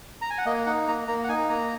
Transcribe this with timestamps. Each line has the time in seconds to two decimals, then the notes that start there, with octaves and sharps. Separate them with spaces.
0.21 A#5
0.30 G#5
0.38 F#5
0.46 A#3 D#5
0.66 D#4 F#5
0.88 A#3 A#5
1.08 A#3 A#5
1.24 F#5
1.29 D#4 G#5
1.50 A#3 A#5